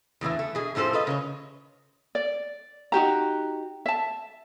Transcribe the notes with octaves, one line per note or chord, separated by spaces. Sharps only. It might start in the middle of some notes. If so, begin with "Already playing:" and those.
E2 A2 D3 E3
A3
B2 G#4
F2 A2 F3 A4 C5
F4 B4 D#5
C#3 B4 C#5
D5
D#4 F#4 G4 A#5
E5 A5